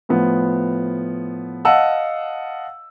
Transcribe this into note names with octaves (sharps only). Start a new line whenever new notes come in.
A2 F3 B3
D#5 F5 F#5 A5 E6